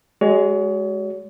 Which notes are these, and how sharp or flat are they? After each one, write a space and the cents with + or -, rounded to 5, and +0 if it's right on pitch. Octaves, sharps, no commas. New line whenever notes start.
G#3 +5 F#4 +35 C#5 +40